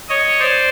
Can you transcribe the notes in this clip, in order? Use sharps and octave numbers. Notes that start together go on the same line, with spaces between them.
C#5 D#5
C5 D5